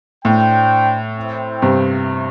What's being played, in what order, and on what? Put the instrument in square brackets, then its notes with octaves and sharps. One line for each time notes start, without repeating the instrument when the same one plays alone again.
[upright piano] A2 [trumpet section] D4 C5 G5
[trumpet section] C4 E4 C5 G5
[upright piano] G2 C3